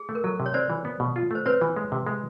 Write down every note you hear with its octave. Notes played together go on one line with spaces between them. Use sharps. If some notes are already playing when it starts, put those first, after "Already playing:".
Already playing: G#4
A3
A#4
F#3 A4
C3
C#5
C4 C5 D5
E3
B3
B2
F4
A3 C5
C4 B4 C#5
E3
G#3
C3
G#3